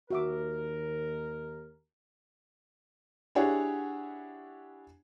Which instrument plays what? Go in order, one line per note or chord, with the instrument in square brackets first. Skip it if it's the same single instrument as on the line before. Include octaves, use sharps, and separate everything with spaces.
[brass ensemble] D#2 A#4 [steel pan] F#4 E5 D6
[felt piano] D4 E4 G4 G#4 C#5 F#5